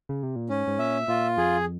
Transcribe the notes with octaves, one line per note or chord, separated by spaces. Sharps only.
C#3
C3
A#2
G#2 C#4
G#2
A#2 E5
A#2 F4
F2 G#4